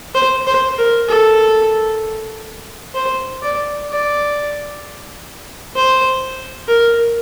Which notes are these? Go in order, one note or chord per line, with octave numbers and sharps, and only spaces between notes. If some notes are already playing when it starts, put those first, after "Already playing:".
C5
C5
A#4
A4
C5
D5
D5
C5
A#4